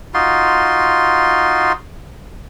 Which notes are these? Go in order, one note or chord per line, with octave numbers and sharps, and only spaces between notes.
D#4 F4 F#4 C6